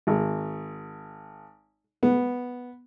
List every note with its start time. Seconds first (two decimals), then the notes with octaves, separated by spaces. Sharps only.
0.07 G#1
2.03 B3